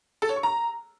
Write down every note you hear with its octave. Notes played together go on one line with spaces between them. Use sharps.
A4
C#5
C#6
A#5